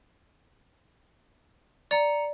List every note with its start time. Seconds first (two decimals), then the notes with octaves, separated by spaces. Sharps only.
1.91 D5 A#5 C#7 F7